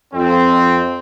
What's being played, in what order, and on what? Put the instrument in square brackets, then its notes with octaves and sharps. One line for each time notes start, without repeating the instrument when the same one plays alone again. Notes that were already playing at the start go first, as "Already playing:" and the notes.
[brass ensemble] F2 C4